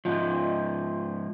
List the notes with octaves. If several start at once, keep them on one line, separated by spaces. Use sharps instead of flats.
G#2 F3